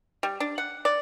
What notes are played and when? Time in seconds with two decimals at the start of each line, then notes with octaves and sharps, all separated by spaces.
0.23 G3
0.40 D4
0.58 F#5
0.85 D5